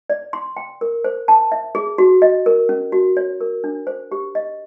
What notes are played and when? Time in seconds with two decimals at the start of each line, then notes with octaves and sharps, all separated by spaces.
0.10 D5
0.33 C6
0.57 G5
0.81 A#4
1.04 C5
1.28 A5
1.52 E5
1.75 G#4
1.98 F#4
2.22 D#5
2.46 A#4
2.69 C#4
2.92 F#4
3.17 C#5
3.41 A#4
3.64 D4
3.87 C5
4.12 G4
4.35 D#5